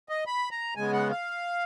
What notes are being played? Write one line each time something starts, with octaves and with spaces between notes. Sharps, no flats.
D#5
B5
A#5
C#3 G#3 B3 G#5
F#5
F5